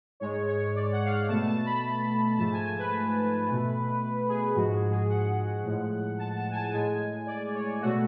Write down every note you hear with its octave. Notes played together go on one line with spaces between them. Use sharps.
G#2 G#3 C#5
C#5
D5
F#5
F5
F#5
B2 A3 A5
A5
B5
G#2 F3 A3 A5
G#5
G#5
B4
B2 A3
G#4
G#2 F3 G#3 F#4
G#4
G#4
F#5
A2 F3 G#3
A5
A5
G#5
A5
A2 G#3 G#5
D5
C#5
B2 A3 F#4